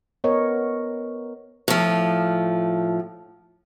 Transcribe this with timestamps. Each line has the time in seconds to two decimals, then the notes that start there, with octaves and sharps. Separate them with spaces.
0.24 B3 A#4 C#5 D#5
1.68 A2 F3